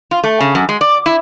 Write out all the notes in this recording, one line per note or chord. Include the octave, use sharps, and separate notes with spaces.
F4
A3
C#3
F#2
G#3
D5
E4